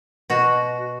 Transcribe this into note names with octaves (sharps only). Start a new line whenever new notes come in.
B2 F#4